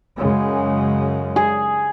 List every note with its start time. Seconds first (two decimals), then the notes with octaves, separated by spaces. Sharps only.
0.17 F#2 C#3 G#3
1.36 G#4